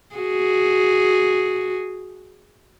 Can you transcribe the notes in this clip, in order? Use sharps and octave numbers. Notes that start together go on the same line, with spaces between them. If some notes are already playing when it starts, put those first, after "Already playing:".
F#4 G#4